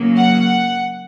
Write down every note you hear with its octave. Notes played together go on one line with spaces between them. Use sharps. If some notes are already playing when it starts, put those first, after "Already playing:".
Already playing: C#3 F#3 A#3
F#5